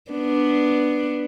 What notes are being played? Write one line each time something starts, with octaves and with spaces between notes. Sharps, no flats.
B3 D4